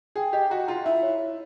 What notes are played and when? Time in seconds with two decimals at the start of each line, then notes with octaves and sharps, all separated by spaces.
0.16 G#4 G5
0.33 G4 D#5
0.50 F#4 A#5
0.68 F4 A#5
0.85 E4 E5
1.03 C#5
1.19 C#5